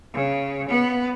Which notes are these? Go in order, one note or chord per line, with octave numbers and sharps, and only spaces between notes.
C#3
B3